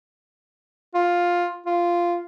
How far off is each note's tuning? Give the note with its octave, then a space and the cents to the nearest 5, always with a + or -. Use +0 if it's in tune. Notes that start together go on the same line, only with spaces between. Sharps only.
F4 +10
F4 -10